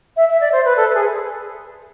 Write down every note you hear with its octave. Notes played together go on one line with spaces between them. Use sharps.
E5
E5
D5
C5
B4
A4
B4
G#4